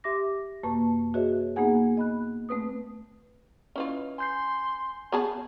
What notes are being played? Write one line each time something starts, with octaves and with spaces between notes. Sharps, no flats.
G4 E5 C6 D6 A#6
F#2 C3 A#3 B4 A5 C#6
F#4 G#4 B4 C#5 D#5 E5
A#3 B3 D#4 G#4 F#5 G#5
D#5 B5 F#6
A3 C4 B4 D#6
C#4 E4 F4 B4 D#5
G#5 C6 G6 C7
B3 G#4 A5